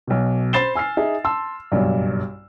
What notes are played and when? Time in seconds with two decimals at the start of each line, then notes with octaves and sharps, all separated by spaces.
0.07 B1 B2
0.53 C5 B5 A6 C7 E7 G7
0.75 G#5 E6 F6 C7
0.97 D#4 G#4 E5
1.24 A5 C6 E6
1.72 F#1 B1 G2